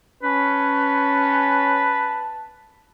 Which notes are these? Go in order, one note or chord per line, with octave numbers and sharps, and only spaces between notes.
C#4 B4 A5